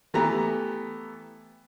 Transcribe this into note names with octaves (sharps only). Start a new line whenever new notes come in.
E3 A3 B3 G4 A#5